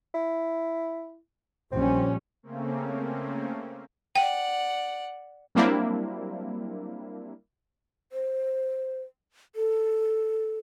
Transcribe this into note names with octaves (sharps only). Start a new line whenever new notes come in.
E4
A#1 G3 C4 C#4
C#3 A3 A#3 C4 C#4
D5 F#5 G5
F#3 G3 A#3 C4 D4 E4
C5
A4